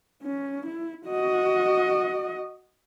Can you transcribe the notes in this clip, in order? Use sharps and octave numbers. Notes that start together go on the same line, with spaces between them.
C#4
E4
F#4 D#5